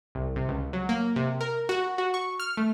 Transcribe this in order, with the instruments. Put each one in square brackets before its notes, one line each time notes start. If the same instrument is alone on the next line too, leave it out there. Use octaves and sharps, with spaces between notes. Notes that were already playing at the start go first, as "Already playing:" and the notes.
[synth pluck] C2
C3
C#2
F#3
A#3
C3
A#4
F#4
F#4
C#6
F6
A3